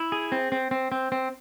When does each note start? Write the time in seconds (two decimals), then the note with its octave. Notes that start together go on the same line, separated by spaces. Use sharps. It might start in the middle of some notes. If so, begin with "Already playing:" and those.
Already playing: E4
0.12 G#4
0.32 C4
0.52 C4
0.71 C4
0.92 C4
1.12 C4